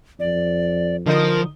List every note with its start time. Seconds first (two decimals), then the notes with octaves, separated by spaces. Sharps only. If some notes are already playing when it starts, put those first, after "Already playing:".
0.20 F2 D5
1.06 D3 F3 D#4 A#4 D#6